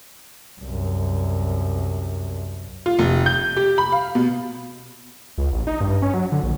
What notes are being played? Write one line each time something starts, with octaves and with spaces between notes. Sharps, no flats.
C2 F#2
F4
F1
G6
G4
B5
F5
B2
C#2
A1
D#4
G2
C#4
F#3
D3
A#1